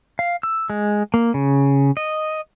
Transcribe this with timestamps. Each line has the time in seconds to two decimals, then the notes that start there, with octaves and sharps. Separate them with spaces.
0.19 F5
0.43 E6
0.70 G#3
1.14 A#3
1.34 C#3
1.97 D#5